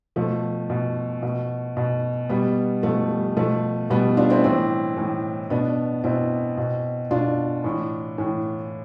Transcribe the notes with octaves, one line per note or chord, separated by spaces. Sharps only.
B2 F3 A3
B2
B2
B2
B2 G3 B3
B2 F3 A3
G3
B2 F3 A3
B2 G3 B3
D4 F4
C4 E4
A2 E3 C4 E4
A2 E3
B2 B3 D4
B2 C4 E4
B2
B2 D4 F4
A2 E3
A2 E3